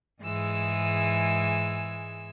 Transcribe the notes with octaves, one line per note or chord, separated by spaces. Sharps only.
G#2 E3 G#3 G#4 E6